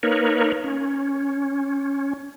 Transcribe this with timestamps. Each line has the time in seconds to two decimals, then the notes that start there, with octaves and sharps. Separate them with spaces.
0.03 A#3 D#4 A#4 B4 C#5
0.64 C#4